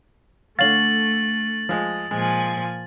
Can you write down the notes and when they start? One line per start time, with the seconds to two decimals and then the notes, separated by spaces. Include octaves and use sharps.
0.59 D3 A3 C#5 F5 A6 F#7
1.69 F3 G#3
2.11 A#2 F3 G#3 G#5